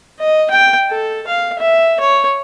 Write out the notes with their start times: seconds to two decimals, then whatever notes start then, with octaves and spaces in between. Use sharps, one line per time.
0.19 D#5
0.51 G5
0.90 A4
1.27 F5
1.59 E5
2.00 C#5